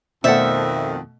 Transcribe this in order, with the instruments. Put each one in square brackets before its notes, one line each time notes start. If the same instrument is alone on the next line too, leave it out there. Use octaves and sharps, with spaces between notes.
[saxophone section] F2 D#3 [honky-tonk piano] B2 A3 [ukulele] C5 D5 F#5 [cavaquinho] E5